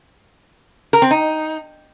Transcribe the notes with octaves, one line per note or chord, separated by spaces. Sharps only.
A#4
C4
D#4